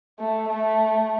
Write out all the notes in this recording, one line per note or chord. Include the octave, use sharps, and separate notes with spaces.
A3
A3